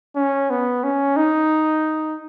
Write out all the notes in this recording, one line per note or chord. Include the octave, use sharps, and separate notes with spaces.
C#4
B3
C#4
D#4